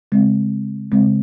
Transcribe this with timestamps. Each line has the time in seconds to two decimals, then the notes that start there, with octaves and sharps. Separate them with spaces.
0.12 C#3 G#3 C4
0.92 C#3 G#3 C4